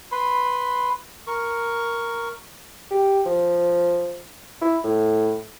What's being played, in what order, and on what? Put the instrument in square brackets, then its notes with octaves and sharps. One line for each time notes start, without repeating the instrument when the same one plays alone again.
[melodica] B4 B5 C6
A#4 C#6
[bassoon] G4
F3
E4
A2